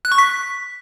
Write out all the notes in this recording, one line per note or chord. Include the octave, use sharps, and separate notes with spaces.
F#6
C#6
B6